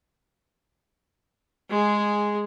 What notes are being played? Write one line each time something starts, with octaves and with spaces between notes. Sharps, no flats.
G#3 G#4